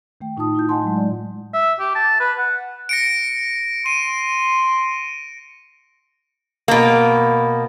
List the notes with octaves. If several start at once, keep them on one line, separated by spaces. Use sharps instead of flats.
D#3 A3 G5
A2 D#4 F4 A5 D#6
E4 F4 G6
D#5 F#5 G#5 A5 C6
F#3 G#3
D5
E5
G4
A5
B4
F#5
A#6 C#7 D7
C6 D#7
B2 A#3